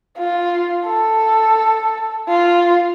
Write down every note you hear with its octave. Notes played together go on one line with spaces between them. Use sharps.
F4
A4
F4